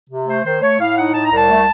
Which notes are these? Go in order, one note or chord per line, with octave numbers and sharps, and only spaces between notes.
C3
A3 C5
D#3 C5
A3 C#5
A2 F5
D#4 F#5
A2 A5
A#5
C2
A5
A3